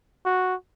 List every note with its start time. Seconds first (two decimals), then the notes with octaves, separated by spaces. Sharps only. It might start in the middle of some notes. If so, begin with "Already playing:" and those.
0.25 F#4